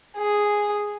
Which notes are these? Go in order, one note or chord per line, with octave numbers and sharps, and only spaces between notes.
G#4